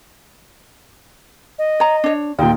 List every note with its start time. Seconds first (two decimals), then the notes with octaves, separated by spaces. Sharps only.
1.58 D#5
1.80 C#5 A#5
2.04 D4 C#5
2.39 D#2 A#2 D#4 G5